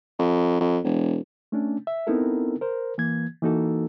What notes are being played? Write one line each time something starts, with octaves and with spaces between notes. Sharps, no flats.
F2
F2
E1
A3 C#4 D4
E5
B3 C4 D#4 E4 A4 A#4
A#4 C5
E3 A#3 G#6
E3 A#3 D#4 F#4 A4